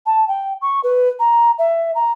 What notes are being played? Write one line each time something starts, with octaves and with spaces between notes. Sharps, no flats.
A5
G5
C#6
B4
A#5
E5
A#5